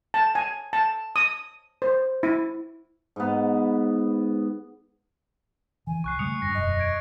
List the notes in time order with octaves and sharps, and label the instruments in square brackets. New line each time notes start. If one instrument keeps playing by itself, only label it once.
[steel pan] A5
G#5
A5
D#6
C5
E4
[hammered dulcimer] G#2 B3
[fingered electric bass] E3 F3 [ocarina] G#5
[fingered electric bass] C2 [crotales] C#6 F#6 C7
[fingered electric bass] C#3 G3 A3 [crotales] D#6 C#7 F7
[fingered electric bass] G2 G3 [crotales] A#6
[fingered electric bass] E1 F#2 [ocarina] D#5
[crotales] G#6 D7